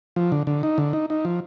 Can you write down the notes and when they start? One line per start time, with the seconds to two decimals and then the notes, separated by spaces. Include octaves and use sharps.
0.16 F3
0.32 D3
0.47 D3
0.63 D#4
0.78 D3
0.93 D#4
1.10 D#4
1.25 F3